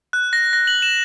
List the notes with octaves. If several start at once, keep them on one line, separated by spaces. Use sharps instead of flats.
F#6
A#6
A#6
F#7
E7